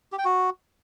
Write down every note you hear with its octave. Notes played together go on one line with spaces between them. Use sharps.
G4
G5
F#4